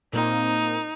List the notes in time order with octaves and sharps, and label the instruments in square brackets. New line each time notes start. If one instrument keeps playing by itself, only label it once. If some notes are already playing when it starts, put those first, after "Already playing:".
[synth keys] A#2 A#3 C4 [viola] D#4